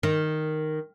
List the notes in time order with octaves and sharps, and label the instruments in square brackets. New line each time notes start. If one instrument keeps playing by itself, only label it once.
[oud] D#3